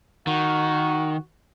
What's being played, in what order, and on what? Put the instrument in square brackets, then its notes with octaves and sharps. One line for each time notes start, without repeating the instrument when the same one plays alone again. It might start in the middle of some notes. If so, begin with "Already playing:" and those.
[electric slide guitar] D#3 [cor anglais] F#4